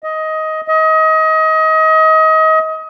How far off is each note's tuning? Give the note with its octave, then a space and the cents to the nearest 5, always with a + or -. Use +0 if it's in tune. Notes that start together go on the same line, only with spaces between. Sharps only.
D#5 +15
D#5 +30